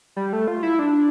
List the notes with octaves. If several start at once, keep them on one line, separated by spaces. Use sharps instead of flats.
G3
A3
F4
E4
D4